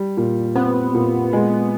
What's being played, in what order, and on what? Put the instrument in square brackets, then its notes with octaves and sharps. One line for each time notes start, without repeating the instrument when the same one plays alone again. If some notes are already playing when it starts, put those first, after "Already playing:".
Already playing: [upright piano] G3
A#2
[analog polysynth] B3 [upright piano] C4
[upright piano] A#2
G#3